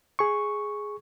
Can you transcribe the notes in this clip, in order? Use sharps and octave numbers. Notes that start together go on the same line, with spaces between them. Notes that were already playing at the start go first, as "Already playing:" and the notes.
G#4 C#6